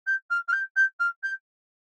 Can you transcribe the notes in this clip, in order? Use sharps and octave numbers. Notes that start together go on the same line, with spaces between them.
G6
F6
F6
G6
G6
F6
G6